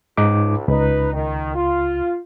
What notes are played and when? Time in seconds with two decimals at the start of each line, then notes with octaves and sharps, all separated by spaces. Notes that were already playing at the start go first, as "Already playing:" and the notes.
0.17 C#2 G#2 D#4 D6
0.68 C#2 D#4 B4
1.13 D#3
1.55 F4